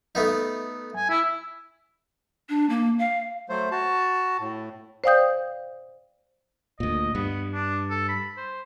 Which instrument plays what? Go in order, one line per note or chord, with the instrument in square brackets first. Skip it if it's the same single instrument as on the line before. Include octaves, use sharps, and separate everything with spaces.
[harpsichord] A3 B3 D#4
[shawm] G#5
E4
[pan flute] D4
A#3
F5
[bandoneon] F#3 A3 C5
F#4 A5
A2
[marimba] C5 D5 F5 G5 D#6 G6
[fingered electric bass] D2 A#2 [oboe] D#5
[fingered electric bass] G2 [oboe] B3
[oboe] D4
A4
B5
C5